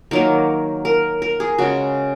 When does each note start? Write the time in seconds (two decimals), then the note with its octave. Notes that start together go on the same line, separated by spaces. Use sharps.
0.11 D#3 F#3 A#3 A#4
0.85 A#4
1.22 A#4
1.40 G#4
1.58 C#3 G#3 F#4